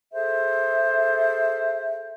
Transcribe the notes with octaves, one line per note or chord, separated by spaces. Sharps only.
G#4 A4 C5 E5